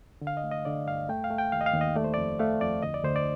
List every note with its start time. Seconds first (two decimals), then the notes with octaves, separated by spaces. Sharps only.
0.21 D3
0.27 F5
0.37 D#5
0.44 A3
0.51 D#5
0.65 D3 D5
0.87 G2 F5
1.09 A3 G5
1.24 F5
1.30 A3
1.38 G5
1.52 D#2 F5
1.61 D#5
1.66 F5
1.73 D#2
1.81 D#5
1.95 A3 D5
2.04 C5
2.14 F2 D5
2.39 A3 F5
2.61 F2 D5
2.83 D2 D#5
2.94 D5
3.04 D2 C5
3.16 D5